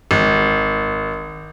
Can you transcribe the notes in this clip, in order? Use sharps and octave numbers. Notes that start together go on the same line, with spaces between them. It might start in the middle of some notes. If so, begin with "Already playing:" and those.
G#1